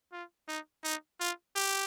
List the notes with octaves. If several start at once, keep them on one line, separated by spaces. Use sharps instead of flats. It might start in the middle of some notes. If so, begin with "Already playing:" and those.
F4
D#4
D#4
F4
G4